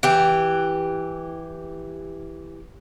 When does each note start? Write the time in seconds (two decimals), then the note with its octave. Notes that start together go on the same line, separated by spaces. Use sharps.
0.03 E3 G4